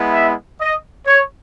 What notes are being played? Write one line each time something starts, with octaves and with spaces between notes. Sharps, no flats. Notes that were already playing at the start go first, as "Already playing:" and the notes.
Already playing: G#3 B3 E4
E5
D#5
C#5